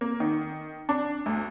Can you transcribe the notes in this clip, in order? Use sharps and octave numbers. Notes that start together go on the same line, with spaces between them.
A#3
D#3
D4
D2